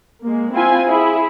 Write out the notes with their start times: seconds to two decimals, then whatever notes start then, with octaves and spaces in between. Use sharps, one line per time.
0.22 G#3 A#3
0.52 C4 E4 F4 G#5
0.87 E4 G#4